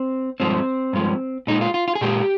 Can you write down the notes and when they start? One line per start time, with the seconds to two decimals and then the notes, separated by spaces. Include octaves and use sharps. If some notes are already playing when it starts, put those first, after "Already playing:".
Already playing: C4
0.40 G2 F3 G#3 C4
0.93 G2 F3 G#3
1.47 A#2 G#3 D#4
1.61 F4
1.74 F4
1.88 F4
1.95 G#4
2.01 A#2 G#3 G4